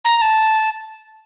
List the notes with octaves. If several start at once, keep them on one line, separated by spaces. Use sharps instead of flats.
A#5
A#5
A5